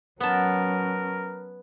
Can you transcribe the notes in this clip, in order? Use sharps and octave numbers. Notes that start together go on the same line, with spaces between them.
F#3 B3 C#4 A#4 A5